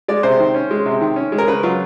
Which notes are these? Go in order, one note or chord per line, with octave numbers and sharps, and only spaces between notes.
G#3 D5
C3 C5
D#3
C#4
G#3
C3
D#3
C#4
G#3
A#4
C#3 B4
F#3 F4